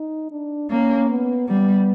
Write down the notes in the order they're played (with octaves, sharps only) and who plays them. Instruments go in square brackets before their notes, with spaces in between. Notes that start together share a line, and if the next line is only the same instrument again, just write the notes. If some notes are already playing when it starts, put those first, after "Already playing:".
Already playing: [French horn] D#4
D4
[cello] A#3 [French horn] C#4
[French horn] B3
[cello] G3 [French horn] B3